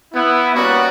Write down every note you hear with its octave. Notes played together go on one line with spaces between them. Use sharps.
B3 E4
G3 A#3 B3 C#4 F#4 D5